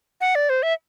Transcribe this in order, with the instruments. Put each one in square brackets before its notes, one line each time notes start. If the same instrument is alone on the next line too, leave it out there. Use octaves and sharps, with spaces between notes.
[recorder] F#5
D5
C5
E5